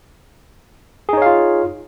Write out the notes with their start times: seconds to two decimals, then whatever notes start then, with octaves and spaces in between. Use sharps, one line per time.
1.09 G#4
1.13 D#4
1.17 C#5
1.22 F5
1.26 F4